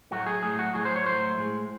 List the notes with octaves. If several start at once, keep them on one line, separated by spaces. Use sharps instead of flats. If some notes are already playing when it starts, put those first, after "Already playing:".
A2 F#3 A3 F#4
G#4
A2 F#3 A3 G#4
F#4
A2 F#3 A3 G#4
C5
C#5
A2 F#3 A3 C5
A2 G#3